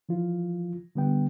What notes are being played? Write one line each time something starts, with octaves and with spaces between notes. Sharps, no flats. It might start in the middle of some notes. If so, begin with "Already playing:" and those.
E3 F3 F4
D3 G3 B3 G5